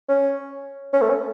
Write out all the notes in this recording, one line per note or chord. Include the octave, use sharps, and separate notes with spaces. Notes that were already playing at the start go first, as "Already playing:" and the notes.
C#4
C#4
A3
C#4